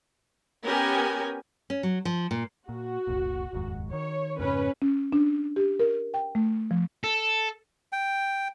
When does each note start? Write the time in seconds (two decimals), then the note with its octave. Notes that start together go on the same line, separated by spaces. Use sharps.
0.65 B3 C#4 G4 A#4 G5 G#5
1.70 C#4
1.83 F#3
2.05 F3
2.31 A#2
2.69 A#2 F#4
3.07 F1 C2 A#2
3.53 F1 D#2 G#2
3.93 D#3 C#5
4.39 F2 G#2 C#3 C#4 B4
4.82 C#4
5.13 D4
5.56 G4
5.80 A#4
6.14 G5
6.35 A3
6.71 F3
7.04 A4
7.93 G5